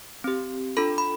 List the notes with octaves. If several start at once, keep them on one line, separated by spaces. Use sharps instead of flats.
C4 G4
D4 F4 A4 B5
B5